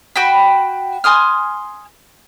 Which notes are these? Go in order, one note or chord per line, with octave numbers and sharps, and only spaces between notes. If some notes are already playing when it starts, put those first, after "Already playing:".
F#4 G5 B5
G#5 C6 D#6 F6